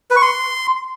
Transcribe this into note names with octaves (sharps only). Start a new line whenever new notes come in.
B4
C#6
C6